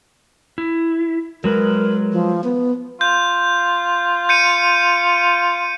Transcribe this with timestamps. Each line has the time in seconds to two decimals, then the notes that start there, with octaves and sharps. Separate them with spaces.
0.58 E4
1.44 F#3 G#3 A#4 B4
2.12 F3
2.44 B3
3.01 F4 G6
4.29 G6 C#7 D#7